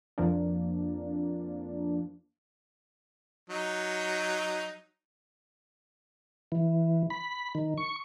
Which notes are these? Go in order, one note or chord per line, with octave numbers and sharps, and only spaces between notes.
F2 F3 A#3 D4
F#3 D#4
E3
B5
D#3
C#6